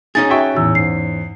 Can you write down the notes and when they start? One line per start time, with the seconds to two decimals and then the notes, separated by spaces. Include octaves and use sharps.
0.15 C#4 D#4 G#4 A6
0.30 F#4 E5 G5 C#6
0.57 E2 A2 E6
0.75 G#2 C7